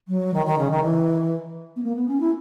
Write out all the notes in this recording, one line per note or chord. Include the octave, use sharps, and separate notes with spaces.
F#3
D#3
D#3
C#3
D#3
E3
B3
A#3
B3
C#4
E4